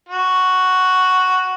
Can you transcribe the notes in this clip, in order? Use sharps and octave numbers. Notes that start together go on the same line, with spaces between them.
F#4